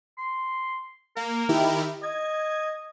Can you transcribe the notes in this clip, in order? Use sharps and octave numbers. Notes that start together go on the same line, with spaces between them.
C6
A#3 A#4
D#3 E4 G4
D#5 G#6